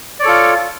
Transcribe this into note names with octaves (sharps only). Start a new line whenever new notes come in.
F4 A4 C#5 D5